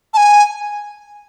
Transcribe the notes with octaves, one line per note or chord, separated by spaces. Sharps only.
A5
G#5